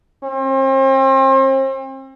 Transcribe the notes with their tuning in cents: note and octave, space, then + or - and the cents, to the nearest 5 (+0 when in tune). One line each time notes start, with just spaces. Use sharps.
C4 +40